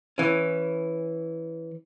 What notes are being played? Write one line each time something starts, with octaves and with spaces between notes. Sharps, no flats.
E3 C#4